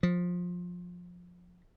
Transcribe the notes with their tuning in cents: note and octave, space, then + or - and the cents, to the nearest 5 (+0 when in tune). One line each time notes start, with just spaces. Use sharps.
F3 +20